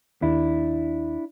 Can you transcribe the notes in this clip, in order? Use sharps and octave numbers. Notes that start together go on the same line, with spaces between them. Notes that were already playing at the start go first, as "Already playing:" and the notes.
D#2 D4 E4